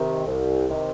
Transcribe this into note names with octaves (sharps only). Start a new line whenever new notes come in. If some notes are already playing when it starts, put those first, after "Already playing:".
Already playing: C3 D#3
C2
C3 D#3